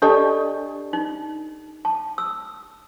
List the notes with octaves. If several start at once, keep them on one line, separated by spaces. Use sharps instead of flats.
D4 G4 A4 D5 D#5 A5
D#4
A5
E6